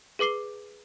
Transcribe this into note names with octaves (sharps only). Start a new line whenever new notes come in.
G#4 B4 D6 C7 G7